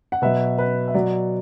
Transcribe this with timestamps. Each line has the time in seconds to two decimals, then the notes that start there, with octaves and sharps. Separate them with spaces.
0.12 F#5
0.22 B2 F#3 B4 E5
0.58 B4
0.88 E5
0.94 B2 F#3 D5